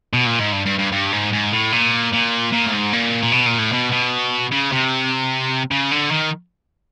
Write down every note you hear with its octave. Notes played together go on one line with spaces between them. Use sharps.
B2
A#2
G#2
G2
G2
G2
G2
G#2
G#2
A2
A#2
A#2
A#2
A2
G#2
A#2
A#2
B2
A#2
A2
B2
B2
C#3
C3
C#3
D3
D#3